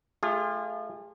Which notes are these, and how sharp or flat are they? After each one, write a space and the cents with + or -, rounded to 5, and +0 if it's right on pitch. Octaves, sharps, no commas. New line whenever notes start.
A3 -25 F4 +0 G#4 -40